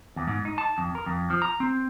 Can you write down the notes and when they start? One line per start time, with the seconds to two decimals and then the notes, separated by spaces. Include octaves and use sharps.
0.16 E2
0.28 G#2
0.45 D#4
0.58 A5
0.78 F2
0.95 A#4
1.06 F2
1.30 F3
1.42 A#5
1.60 C4